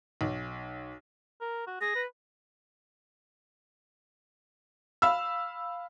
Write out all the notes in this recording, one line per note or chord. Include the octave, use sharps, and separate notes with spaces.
B1
A#4
F#4
G#4 A#6
B4
F5 B5 E6